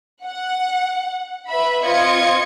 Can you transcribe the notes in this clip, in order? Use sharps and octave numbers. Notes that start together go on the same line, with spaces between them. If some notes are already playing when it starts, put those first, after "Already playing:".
F#5
B4 E5 B5
C4 F4 D#5 G#6 C#7